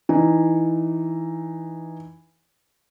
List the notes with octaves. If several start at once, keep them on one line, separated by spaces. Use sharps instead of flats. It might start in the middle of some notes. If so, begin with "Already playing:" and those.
E3 D#4